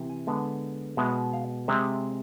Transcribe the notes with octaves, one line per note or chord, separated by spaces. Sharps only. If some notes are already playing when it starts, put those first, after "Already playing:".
Already playing: C3 E3
G#5
D3 G#3 B3
B2 G#3 B3 E5
F5
C3 G#3 C4 E5